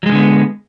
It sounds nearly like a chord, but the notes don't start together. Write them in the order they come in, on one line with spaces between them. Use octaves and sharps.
F#3 G#3 D#3 D3 B3